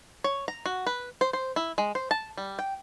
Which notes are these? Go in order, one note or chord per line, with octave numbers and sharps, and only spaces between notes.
C#5
A#5
F#4
B4
C5
C5
E4
G#3
C5
A5
G3
G5